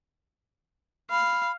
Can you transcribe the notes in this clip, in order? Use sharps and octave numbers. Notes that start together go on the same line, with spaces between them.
F5 B5